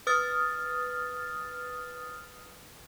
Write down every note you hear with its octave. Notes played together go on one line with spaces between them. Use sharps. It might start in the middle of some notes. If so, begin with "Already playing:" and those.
B4 D#6 F6 A6